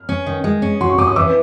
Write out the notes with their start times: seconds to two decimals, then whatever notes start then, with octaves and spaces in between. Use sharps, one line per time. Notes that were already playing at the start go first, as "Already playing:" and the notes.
Already playing: F6
0.09 C#4
0.26 D#3
0.44 G#3
0.62 C#4
0.81 F#4 C6
0.90 C#6
0.98 C#4 D6
1.07 D#6
1.16 E3 D6 E6